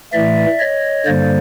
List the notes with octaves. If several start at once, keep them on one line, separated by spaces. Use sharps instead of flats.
A2 E3 A3 D5 E5
C#5 D#5
G2 D3 G3 A#3 C5 D5